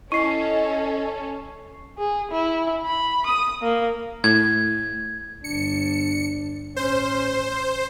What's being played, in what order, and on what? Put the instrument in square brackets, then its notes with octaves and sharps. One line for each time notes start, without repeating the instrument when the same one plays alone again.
[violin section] C#4 A4 [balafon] E4 [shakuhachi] D#5 [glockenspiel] C#6 C7
[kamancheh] G#4
E4
B5
D#6
A#3
[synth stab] A2 [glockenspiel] G#6
[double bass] G1 D4 [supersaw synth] C#7
[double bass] A1 C#4 [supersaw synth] C5